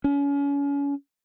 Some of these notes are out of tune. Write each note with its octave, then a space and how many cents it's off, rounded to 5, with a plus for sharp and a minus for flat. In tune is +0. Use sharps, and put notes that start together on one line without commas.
C#4 +35